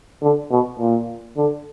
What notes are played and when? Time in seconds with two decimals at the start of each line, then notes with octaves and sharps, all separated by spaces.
0.22 D3
0.51 B2
0.79 A#2
1.37 D3